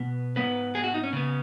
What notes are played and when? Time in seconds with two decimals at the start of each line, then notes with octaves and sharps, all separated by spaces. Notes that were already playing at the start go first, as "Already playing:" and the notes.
Already playing: B2 B3
0.36 G#2 D#3 B3 B4
0.75 G#4
0.84 F#4
0.94 D#4
1.03 C#4
1.13 C#3 B3